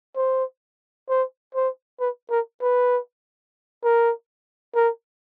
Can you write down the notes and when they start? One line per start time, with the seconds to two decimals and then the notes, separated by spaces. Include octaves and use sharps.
0.16 C5
1.09 C5
1.55 C5
2.00 B4
2.31 A#4
2.62 B4
3.84 A#4
4.75 A#4